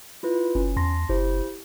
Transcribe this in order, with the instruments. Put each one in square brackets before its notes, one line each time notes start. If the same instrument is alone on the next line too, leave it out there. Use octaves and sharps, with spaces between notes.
[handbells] E4 F4 B4
[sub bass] F#1 [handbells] C#4
[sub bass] E2 [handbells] A5 C6 A#6
[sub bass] F#1 [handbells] E4 G4 C5